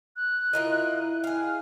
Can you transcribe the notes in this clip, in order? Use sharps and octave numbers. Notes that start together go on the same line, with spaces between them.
F#6
E4 F4 A#4 D#5
G#4 F5 F6